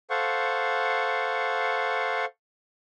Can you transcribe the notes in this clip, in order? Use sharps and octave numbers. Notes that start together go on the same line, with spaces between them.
A4 C5 F5 F#5 C#6